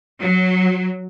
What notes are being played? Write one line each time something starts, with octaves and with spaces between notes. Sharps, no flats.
F#3